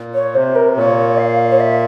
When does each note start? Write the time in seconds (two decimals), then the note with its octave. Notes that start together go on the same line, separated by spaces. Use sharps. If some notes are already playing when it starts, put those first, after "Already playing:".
Already playing: A#2
0.14 C#5
0.35 C3 C5
0.55 A#4
0.69 C5
0.76 A#2 C#5
1.18 F5
1.51 C#5
1.61 E5